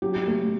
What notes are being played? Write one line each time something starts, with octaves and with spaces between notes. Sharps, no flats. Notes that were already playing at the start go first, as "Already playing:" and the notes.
F#3 G4
A3